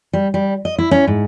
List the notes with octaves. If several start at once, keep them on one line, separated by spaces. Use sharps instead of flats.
G3
G3
D#5
E4
C#4
G#2